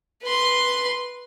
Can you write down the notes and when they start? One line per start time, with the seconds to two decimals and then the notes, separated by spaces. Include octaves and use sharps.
0.23 B4 C6